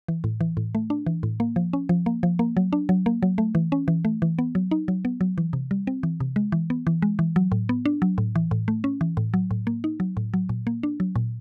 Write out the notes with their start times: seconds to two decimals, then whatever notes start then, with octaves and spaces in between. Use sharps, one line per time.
0.08 E3
0.24 A2
0.41 E3
0.57 A2
0.75 A3
0.90 D4
1.07 E3
1.23 A2
1.40 A#3
1.56 F3
1.73 C#4
1.89 F3
2.06 A#3
2.23 F3
2.39 A#3
2.57 F#3
2.73 D4
2.89 F#3
3.06 A#3
3.23 F#3
3.38 A3
3.55 E3
3.72 C#4
3.88 E3
4.05 A3
4.22 E3
4.39 B3
4.55 F#3
4.71 D#4
4.88 F#3
5.05 B3
5.21 F#3
5.38 E3
5.53 C3
5.71 G3
5.87 C4
6.03 E3
6.20 C3
6.36 G#3
6.52 E3
6.70 B3
6.87 E3
7.02 G#3
7.19 E3
7.36 F#3
7.52 A2
7.69 B3
7.86 D4
8.02 F#3
8.18 A2
8.36 E3
8.51 A2
8.68 A3
8.84 C#4
9.01 E3
9.17 A2
9.34 F#3
9.51 A2
9.67 A#3
9.84 D#4
10.00 F#3
10.17 A2
10.34 F#3
10.49 A#2
10.67 A#3
10.83 D4
11.00 F#3
11.16 A#2